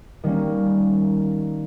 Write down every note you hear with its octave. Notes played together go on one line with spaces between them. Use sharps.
D#3 G3 A#3 C#4